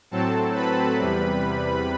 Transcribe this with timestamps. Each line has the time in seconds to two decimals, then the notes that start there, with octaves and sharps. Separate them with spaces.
0.11 A2 F#3 C4 A4 A5
0.54 B4 B5
0.98 E2 C3 G3